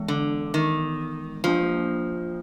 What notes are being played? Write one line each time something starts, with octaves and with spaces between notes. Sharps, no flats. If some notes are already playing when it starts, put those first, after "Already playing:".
Already playing: E3 G#3 B3
D3
D#3
F3 A#3 D4 F4